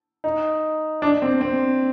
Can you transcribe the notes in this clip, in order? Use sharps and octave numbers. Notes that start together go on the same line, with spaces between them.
D#4
D4
C4
C4